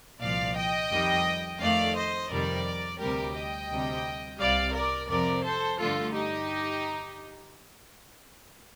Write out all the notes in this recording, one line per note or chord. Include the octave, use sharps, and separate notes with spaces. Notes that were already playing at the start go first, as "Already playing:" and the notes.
C2 A#2 F3 D5 F5
D#5 G5
F2 D#3 G3
F2 D#3 A3 D5 F5
C5 D#5
F2 C3 D#3 G3 A#4 D5
D2 C3 G3 G4 A#4
D#5 G5
D2 C3 G3
C2 C3 G3 D5 F5
A#4 D5
F2 C3 F3 A#4 D5
A4 C5
G2 D3 A3 F4 A4
D#4 G4